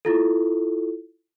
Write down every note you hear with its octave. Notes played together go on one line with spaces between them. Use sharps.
E4 F4 A4